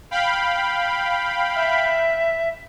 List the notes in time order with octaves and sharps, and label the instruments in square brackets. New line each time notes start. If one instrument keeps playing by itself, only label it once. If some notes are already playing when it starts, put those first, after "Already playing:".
[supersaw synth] F5 G5 B5
[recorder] E5